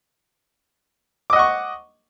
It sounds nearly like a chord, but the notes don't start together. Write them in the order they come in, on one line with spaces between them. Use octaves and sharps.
D6 D#5 F#5 C#6